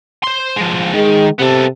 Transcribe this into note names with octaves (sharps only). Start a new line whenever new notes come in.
C5 C6
F3 G#3
D#3 G#3
C3 B3 A4